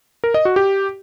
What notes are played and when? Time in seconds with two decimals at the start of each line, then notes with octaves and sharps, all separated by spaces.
0.24 A#4
0.34 D#5
0.45 F#4
0.56 G4